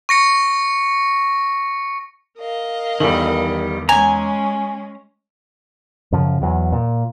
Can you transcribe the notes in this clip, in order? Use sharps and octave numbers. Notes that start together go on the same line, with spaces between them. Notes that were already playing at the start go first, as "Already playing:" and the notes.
C#6 A#6 C#7
A#4 D#5 F5
E2 D#3 G3 A4 F#7
G#3 C#4 G#5 A#5
F#2 C#3 F3
E2 F#3
A#2